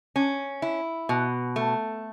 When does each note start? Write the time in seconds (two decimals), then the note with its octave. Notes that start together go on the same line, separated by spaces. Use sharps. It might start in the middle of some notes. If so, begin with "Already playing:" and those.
0.16 C#4
0.62 E4
1.09 B2
1.56 A3